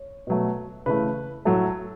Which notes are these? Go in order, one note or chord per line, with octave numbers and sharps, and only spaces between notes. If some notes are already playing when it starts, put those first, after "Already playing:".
Already playing: C#5
B2 F#3 A3
C#3 E3 A3 B4
A2 F#3 A3 A4